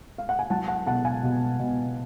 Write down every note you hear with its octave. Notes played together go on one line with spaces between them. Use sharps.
F5
F#5
G#5
F#3 F#5 A5
F#5 A5
B2 F#5 A5
F5 G#5
B2
B2